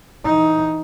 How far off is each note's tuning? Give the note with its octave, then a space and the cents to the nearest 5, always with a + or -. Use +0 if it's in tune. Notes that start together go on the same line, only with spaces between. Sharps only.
E3 +0 D#4 +10